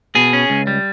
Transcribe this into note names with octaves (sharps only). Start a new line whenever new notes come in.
B2 G#4
C#4
C#2
G3